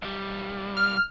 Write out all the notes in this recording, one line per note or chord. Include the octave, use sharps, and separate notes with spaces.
B1 G3
F6